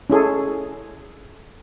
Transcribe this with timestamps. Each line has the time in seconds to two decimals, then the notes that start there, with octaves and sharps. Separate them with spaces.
0.10 C#4 E4 G#4 A4